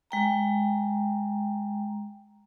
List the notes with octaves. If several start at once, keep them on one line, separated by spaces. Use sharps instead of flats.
G#3 G5 A#5